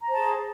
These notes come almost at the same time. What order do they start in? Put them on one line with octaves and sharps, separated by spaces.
A#5 C5 A5 G#4